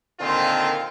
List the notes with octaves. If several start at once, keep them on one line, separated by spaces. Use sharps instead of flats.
A#2 D3 D#3 C4 F4 C5